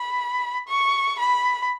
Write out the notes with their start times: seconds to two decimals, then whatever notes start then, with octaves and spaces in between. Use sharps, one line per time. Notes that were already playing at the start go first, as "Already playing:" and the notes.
Already playing: B5
0.68 C#6
1.19 B5